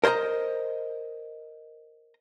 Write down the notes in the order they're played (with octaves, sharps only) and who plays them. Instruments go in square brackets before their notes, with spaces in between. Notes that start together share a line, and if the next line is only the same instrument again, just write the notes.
[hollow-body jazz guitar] A#4 C5 C#5 D#5 A#5